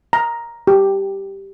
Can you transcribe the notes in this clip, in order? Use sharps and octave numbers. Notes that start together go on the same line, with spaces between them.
A#5
G4